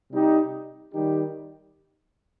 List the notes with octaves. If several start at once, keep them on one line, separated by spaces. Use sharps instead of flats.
C3 G3 D#4 G4
D#3 G3 D#4 G4